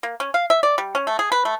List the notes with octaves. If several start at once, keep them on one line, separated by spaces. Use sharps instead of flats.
A#3
C#4
F5
E5
D5
G3
C#4
A3
G#4
B4
A3